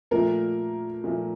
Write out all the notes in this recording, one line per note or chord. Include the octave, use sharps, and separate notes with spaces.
A#2 F3 A3 A#3 A#4
A#2 F3 A3